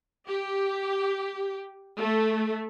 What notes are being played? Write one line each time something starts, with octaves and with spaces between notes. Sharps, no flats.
G4
A3